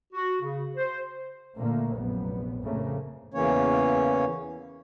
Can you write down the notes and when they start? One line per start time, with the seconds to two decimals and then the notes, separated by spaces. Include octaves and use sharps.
0.13 F#4
0.41 C#3
0.77 C5
1.56 A#2 D3 A3 A#3
1.94 F1 A#1 F#2 B3
2.62 C2 F2 A2 C#3 A3 A#3
3.34 E2 C#3 E3 A#3 C#4 C#5